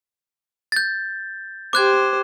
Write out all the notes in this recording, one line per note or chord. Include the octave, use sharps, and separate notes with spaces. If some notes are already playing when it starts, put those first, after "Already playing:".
G6 A6
G4 C5 D6 F#6 G#6